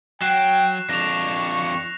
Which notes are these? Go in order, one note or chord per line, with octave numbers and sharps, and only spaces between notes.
F#3 G5 F#6 C7 E7
F2 D4 C#6 A#6 F7